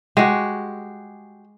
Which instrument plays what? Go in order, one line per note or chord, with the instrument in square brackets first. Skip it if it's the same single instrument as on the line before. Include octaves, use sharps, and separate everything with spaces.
[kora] G#3 [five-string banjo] F#4 G4